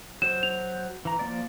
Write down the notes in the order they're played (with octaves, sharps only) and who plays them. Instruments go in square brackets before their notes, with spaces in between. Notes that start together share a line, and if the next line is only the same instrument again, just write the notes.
[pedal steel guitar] F#3 C5 [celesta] E7
[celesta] F7
[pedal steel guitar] E3 A#5
F3 A#3 D5